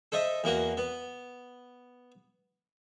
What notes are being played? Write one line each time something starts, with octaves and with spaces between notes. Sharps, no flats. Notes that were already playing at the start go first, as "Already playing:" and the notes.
A4 C5 D#5 E5
E2 A#3 F#4
B3